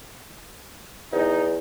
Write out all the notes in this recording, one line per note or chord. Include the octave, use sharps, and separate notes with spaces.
E2 D#4